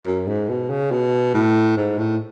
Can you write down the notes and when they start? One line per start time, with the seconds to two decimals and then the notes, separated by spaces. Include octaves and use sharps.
0.06 F#2
0.27 G#2
0.49 B2
0.70 C#3
0.92 B2
1.35 A2
1.77 G#2
1.98 A2